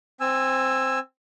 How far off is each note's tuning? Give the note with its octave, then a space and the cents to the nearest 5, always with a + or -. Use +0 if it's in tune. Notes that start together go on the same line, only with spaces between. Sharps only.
C4 +0 G#5 -15 E6 +10